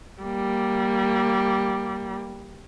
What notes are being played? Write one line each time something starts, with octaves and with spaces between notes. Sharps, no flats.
G3 A#3